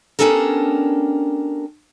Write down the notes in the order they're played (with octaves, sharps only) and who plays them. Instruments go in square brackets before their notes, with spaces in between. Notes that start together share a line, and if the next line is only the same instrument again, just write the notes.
[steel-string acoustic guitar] B3 C#4 D4 G4 A4 A#4